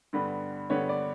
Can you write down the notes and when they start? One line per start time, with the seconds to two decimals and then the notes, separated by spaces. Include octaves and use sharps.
0.13 G2 D3 G3 B3
0.70 G2 D3 G3 B3 C#5
0.89 D5